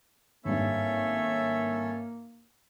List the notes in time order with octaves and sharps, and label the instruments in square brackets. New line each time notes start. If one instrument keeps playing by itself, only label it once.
[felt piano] G#1 G2 [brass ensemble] A#3 [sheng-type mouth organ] C#4 A4 C#5 [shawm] E5